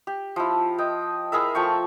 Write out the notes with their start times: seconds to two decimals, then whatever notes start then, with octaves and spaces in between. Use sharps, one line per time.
0.07 G4
0.36 F3 E4
0.78 D#5 G5
1.32 E4 G#4 A#4 E5
1.55 F3 A3 G5 C#6